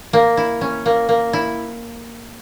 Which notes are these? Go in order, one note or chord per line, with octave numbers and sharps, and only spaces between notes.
A#3
E4
C#4
A#3
A#3
E4